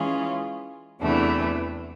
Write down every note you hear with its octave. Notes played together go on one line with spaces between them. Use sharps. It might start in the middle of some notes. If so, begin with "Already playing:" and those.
Already playing: E3 G#3 C#4 F4 G#4
E2 C3 E3 A3 D4